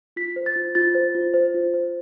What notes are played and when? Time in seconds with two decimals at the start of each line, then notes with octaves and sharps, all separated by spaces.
0.16 F4 B6
0.36 C5
0.46 A6
0.56 F4
0.75 F4 A6
0.95 C5
1.15 F4
1.34 C5
1.54 F4
1.74 C5